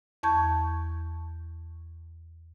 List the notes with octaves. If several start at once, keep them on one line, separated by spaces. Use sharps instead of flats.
E2 A5 C#6 G6 G#6